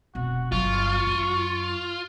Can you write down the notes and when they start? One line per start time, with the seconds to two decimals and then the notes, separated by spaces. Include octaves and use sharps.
0.15 F1 B2 F#4
0.52 G1 F#3 F4 C#6
1.07 F#2